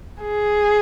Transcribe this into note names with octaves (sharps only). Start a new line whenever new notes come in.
G#4